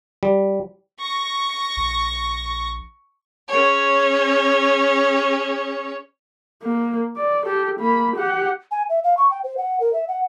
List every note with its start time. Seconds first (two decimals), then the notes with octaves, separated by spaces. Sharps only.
0.23 G3
1.00 C#6 A#6
1.77 A#1
3.48 C#4 G#4 C#5
6.63 A#3
7.17 D5
7.46 G4 A4
7.80 A#3 B5
8.17 G4 F#5
8.71 G#5
8.89 E5
9.04 F5
9.17 C#6
9.31 G5
9.44 C5
9.57 F#5
9.80 A#4
9.93 E5
10.08 F#5